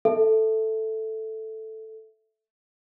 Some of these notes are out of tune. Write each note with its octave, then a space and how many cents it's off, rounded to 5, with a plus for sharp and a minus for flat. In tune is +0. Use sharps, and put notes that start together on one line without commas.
A4 +0 E5 +0